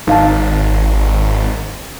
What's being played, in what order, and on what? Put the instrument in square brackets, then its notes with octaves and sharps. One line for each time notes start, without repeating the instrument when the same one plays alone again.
[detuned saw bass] G#1 [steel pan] D#4 F5 A5